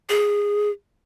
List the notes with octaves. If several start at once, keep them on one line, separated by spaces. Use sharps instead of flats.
G#4